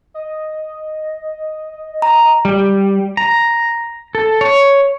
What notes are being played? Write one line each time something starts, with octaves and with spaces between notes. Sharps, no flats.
D#5
A#5
G3
A#5
A4
C#5